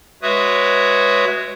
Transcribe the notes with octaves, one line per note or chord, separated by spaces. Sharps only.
G#3 F#4 B4 C#5 E5 D#6